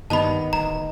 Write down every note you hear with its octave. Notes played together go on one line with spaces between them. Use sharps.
G2 D#3 B3 A5 B5
D1 A#5